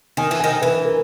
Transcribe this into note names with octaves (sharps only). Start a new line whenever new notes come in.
D#3 G#5
E3
D#3 G#5
E3 B4
A#4